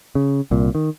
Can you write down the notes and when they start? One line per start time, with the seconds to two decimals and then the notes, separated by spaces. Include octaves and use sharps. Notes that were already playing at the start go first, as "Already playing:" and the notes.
0.15 C#3
0.51 C2 A#2
0.75 D#3